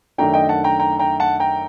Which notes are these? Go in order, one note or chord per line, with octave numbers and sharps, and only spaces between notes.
F#2 D#3 A3 D4 G5 A#5
D#5 G5
F#5 A5
G5 A#5
G5 A#5
G5 A#5
F#5 A5
G5 A#5